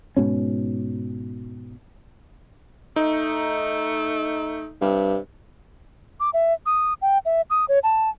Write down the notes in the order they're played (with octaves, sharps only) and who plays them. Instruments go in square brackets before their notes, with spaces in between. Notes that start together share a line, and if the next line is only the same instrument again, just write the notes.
[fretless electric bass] G#2 B2 C#4
[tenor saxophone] A3 [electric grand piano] D#4
[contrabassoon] G2 [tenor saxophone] C3
[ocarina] D6
E5
D#6
G5
E5
D#6
C#5
A5